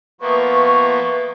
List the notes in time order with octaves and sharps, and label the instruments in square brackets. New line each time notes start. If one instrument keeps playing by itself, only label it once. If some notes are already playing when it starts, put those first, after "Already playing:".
[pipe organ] F3 A#3 B3 [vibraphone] B4 E5 D#6 [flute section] C#6